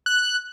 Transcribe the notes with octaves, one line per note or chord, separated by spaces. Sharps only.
F#6